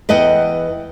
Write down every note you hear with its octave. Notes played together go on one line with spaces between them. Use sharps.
E2 B4 D#5 F#5 G5